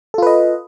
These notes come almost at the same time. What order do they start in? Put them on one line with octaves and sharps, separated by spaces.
A4 F4 B4 D#5